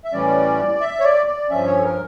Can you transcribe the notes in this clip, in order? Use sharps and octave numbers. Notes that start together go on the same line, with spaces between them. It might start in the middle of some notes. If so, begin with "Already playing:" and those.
E5
A2 E3 G3 C#4 D5
E5
C#5
D5
D5
G2 F3 C#4 E5
C#5
A4
A#4